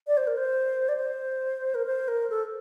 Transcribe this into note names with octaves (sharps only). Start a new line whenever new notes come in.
D5
C5
A#4
C5
D5
C5
A#4
C5
A#4
A4